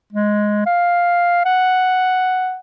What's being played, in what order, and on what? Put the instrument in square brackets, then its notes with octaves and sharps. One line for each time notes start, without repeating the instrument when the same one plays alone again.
[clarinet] G#3
F5
F#5